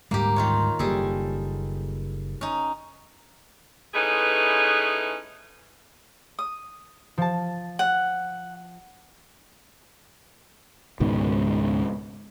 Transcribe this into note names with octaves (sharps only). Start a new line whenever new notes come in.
D2 G#2 G3 A#3 G4
D#3 F4 C#5
F#1 G3 A#3 G#4 A4
C#4 D#4
E3 A3 C#4 D#4 G#4 B4
D#6
F3 A5
F#5
C#2 G#2 B2 D#3